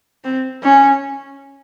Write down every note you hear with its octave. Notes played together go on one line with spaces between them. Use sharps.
C4
C#4